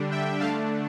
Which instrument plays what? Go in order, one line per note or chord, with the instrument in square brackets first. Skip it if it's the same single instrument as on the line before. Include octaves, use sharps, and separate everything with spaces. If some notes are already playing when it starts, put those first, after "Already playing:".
Already playing: [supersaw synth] D3 G3 D4
E5 G5
D3 A3 D4 F5 A5